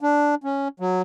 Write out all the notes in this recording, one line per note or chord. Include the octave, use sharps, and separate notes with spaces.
D4
C#4
F#3